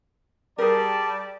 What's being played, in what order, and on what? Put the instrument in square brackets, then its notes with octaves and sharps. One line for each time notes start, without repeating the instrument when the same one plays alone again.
[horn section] G3 A5 [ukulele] G#4 A#4 [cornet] D5